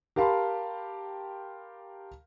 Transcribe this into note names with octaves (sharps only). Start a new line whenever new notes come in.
G4 A#4 F5 A5 B5 C6